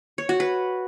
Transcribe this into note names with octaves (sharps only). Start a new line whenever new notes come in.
C#5
F#4
B4